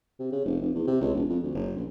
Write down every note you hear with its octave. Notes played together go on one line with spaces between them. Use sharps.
C3
C#3
F1
F1
E2
C3
C#2
E1
F2
D2
F#1
A#1